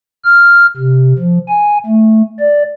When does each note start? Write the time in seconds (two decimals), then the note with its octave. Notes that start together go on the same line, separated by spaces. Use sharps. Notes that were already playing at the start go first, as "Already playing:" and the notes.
0.24 F6
0.77 C3
1.19 F3
1.49 G#5
1.86 A3
2.39 D5